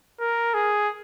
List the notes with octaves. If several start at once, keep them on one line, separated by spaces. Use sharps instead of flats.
A#4
G#4